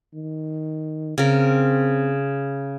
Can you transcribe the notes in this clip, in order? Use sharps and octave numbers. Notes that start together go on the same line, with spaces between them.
D#3
C#3 C4 A#4